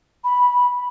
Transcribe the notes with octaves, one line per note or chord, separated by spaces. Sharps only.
B5